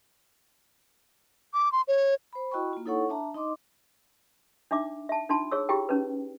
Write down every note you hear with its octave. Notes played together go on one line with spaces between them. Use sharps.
D6
C6
C#5
C5 B5
E4 F#4 D#5 G5 B5 C#6
A#3 F4
D#4 E4 A4 C#5 F#5 C#6
D4 E5 A5 A#5
D#4 D#5 C6 D6
D4 D#4 E5 D6
E5 A5
D4 D#4 F4 A5 C6
G#4 C#5 E6
E4 F4 G4 G#4 G5
C#4 D#4 B4